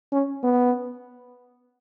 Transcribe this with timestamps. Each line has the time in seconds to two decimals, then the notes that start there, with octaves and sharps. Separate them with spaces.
0.13 C#4
0.44 B3